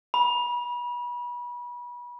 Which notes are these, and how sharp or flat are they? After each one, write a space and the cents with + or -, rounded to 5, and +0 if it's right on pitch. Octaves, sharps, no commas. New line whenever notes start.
B5 -30